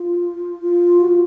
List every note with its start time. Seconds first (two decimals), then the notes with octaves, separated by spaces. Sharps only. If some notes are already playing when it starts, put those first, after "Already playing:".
Already playing: F4
0.62 F4
1.01 F#4
1.09 F4